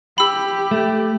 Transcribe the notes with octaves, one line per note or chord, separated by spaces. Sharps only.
G4 B5 E6
A3